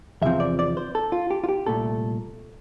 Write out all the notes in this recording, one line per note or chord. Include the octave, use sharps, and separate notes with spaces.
E2 C3 F3 C4 E5
D5
D5
C5
A4
F4
G4
F4
G4
C2 A#2 A3 A4